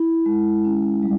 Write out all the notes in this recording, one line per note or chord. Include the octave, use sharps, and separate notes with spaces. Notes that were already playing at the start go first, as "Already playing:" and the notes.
Already playing: E4
G#3
C#4
G3